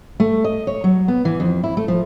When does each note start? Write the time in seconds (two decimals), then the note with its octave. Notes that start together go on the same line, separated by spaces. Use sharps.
0.20 A3
0.44 D#5
0.67 C#5
0.84 F#3
1.08 B3
1.25 E3
1.40 F2
1.64 E4
1.77 A3
1.88 F3